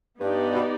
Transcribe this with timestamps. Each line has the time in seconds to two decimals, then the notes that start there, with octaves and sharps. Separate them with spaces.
0.20 G2 B3 D#4 G4 D5
0.54 B2